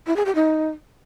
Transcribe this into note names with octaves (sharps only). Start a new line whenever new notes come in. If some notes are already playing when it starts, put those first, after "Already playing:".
E4
G#4
G4
D#4